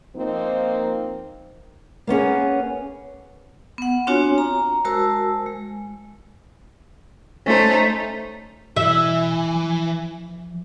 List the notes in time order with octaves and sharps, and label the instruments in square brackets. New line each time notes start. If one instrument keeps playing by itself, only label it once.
[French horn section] F3 A#3 C4 D#4
[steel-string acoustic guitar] A#3 B3 C#4 G#4
[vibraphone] B3 F#5
C4 D4 F4 F#4 C#5 G#5
A#5
G#3 F#4 A#4 C5 A5 E6
G#3
[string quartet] A3 D#4 [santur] C#4 C5
[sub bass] B2 [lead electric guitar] E3 [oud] E5
[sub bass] F3